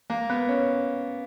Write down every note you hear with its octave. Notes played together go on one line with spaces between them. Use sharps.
A#3
B3
C#4